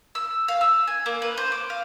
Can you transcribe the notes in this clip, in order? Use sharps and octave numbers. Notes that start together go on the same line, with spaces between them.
E6
F5
E6
G#5
A#3
B4
C5
D6
F5